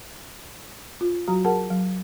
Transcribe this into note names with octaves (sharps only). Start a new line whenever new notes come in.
F4
F#3 F#4 A#5
G#4 A#4 F#5 A5
F#3